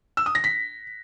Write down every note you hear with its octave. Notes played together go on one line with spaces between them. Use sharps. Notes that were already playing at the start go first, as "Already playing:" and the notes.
E6
D#6
A#6
B6